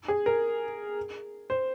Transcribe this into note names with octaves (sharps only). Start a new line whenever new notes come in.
G#4
A#4
C5